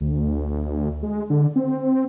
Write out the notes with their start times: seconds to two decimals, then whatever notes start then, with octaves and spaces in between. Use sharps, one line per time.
0.01 D2
1.03 G#3
1.30 D3
1.56 C4